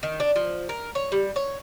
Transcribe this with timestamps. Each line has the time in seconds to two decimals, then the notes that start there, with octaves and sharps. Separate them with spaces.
0.03 D#3
0.20 D4
0.36 F3
0.69 A#4
0.95 C#5
1.12 G3
1.36 C#5